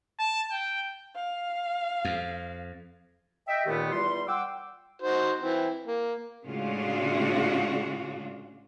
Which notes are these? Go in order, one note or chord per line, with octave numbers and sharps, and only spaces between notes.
A5
G5
F5
F2
D#5 E5 G5
D#2 A#2 D#3 A3 B3 G4
E2 G3 F4 C6
F#5 G5 D6 E6
D#4 F#4 C5
E3 C4
A#3
A2 C#3 G#3 D4 F4 F#4